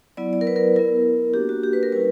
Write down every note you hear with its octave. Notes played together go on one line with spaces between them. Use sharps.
F#3 B3 E4 D5
D5
A#4
B4
A#4
B3 E4 A#4
A#3 D4 F#4 G4
F#4
G4
B4
A#4
G3 C#4 E4 B4